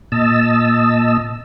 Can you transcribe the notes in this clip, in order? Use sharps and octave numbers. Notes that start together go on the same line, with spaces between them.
A#2 D#5 A5 E6